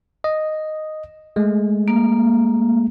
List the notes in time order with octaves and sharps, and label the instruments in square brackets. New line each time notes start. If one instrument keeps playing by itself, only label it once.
[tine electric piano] D#5
G#3 A3
[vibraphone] A#3